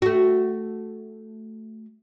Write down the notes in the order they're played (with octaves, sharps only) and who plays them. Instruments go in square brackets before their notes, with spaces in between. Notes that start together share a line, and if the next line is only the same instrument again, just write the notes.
[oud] A3 F#4